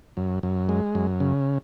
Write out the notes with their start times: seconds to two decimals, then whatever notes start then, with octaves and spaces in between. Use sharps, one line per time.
0.17 F#2
0.43 F#2
0.69 G#3
0.95 F#2
1.20 C#3